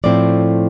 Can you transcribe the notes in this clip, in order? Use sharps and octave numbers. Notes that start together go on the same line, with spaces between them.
A2 F3 A3 C4 E4 D5